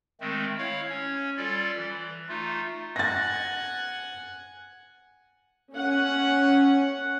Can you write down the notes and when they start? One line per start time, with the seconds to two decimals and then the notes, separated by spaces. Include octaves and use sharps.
0.21 D#3 G#3 A3 C4
0.58 E4 C#5 F5
0.90 C#4 C#5
1.37 G3 F4 A4 D5
1.77 E3
2.29 A3 D#4 F4
2.96 F#5 G#5 A6 A#6
5.74 C#4 F#5